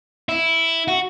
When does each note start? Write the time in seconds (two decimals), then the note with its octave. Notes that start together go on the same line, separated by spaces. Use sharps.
0.29 E4
0.88 F#4